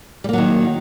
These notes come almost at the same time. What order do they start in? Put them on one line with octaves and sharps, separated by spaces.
G3 A#3 F#3 D#3